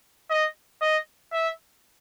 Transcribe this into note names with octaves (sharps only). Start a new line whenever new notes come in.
D#5
D#5
E5